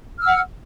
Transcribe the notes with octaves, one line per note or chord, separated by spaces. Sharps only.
F#5 E6 F6